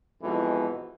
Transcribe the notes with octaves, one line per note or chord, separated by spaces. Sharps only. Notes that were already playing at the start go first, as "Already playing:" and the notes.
F2 G#2 B2 E3